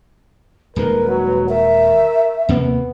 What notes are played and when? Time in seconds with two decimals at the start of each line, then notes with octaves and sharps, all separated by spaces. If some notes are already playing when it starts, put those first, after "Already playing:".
0.76 D#1 D#3 G#3 A#4 B4
1.07 F#3
1.49 A#4 E5
2.49 D#2 C3 A#3 B3